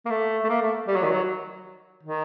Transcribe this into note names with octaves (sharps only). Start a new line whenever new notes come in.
A#3
A3
A3
A#3
A3
G3
F#3
D#3
F#3
D#3